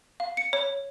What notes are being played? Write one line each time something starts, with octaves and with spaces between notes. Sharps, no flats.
F5
C#7
C#5